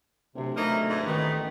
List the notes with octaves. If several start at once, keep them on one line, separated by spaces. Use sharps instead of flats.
D1 C3
E3 A3 A#3 D#4
G#2
A1 D#3 A3 B3